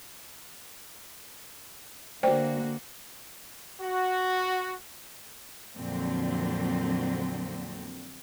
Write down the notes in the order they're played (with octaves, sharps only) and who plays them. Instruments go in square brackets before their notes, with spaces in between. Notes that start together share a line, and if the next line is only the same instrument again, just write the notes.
[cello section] D3 A#3 F#4 [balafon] C5 D5 G5
[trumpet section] F#4
[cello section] F2 A#2 D3 F#3 C4